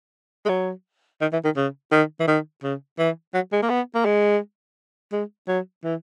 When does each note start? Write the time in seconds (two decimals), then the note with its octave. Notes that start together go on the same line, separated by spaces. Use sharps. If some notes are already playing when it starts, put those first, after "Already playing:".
0.45 G#3
0.49 F#3
1.21 D#3
1.33 E3
1.44 D#3
1.57 C#3
1.92 D#3
2.20 E3
2.28 D#3
2.63 C#3
2.99 E3
3.35 F#3
3.53 G#3
3.63 A#3
3.70 B3
3.95 A#3
4.05 G#3
5.13 G#3
5.48 F#3
5.84 E3